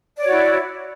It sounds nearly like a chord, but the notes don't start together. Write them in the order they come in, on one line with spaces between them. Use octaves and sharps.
D5 C#5 F#4 E4